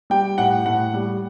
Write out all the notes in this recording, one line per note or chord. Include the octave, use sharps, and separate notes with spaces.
G3 G5
A2 F#5
A2 F#5
G3